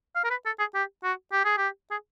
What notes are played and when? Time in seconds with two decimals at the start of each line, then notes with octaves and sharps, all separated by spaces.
0.15 F5
0.24 A#4
0.30 B4
0.46 A4
0.59 G#4
0.74 G4
1.04 F#4
1.32 G4
1.45 G#4
1.58 G4
1.91 G#4